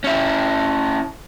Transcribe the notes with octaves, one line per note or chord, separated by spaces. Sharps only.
C#4 E4